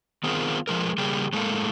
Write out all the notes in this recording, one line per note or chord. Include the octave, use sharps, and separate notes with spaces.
D#3 B3 C4 F4 G#4 A#4
F3 G#3 A#4
C#3 G3 A#3 G4 G#4
A2 G#3 A#3 A4 F5